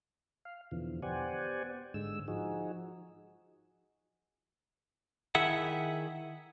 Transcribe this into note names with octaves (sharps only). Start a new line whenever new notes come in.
F5
E2 B2 D3 E3 F3
B3 G4 C5 D5 F#5 G#5
G#2 D3 G#3 E6
F3 D#4 F#4 G#4
D#3 E4 G#4 E5 F#5